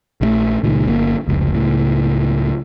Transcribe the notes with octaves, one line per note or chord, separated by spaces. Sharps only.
A#1 D#3 A3
C#2 A#2 D#3
G1 A#2 A#3
F1 C#2
C#2 A2